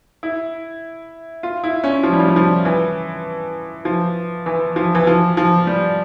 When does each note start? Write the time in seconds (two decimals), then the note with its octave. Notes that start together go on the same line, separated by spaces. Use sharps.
0.23 E4
1.43 F4
1.64 E4
1.84 C#4
2.03 F3
2.13 G3
2.20 F3
2.28 G3
2.36 F3
2.65 E3
3.85 F3
4.46 E3
4.76 F3
4.95 E3
5.07 F3
5.37 F3
5.67 G3